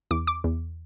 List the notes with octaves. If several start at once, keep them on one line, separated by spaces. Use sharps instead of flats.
E2 D6
D6
E2